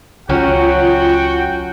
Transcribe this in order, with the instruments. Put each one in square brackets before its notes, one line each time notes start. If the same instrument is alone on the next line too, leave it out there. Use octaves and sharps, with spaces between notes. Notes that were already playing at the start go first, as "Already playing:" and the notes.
[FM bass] C#2 [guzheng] F#3 C#4 [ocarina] F4 [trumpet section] F#4 F#5 G5